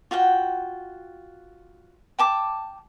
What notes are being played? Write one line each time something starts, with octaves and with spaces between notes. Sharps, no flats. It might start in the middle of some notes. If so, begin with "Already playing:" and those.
F4 F#4 F#5 G5
G5 A5 D6